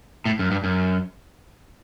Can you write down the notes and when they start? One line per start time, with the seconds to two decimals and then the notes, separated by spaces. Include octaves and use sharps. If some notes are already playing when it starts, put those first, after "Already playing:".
0.25 A2
0.39 F#2
0.51 G2
0.64 F#2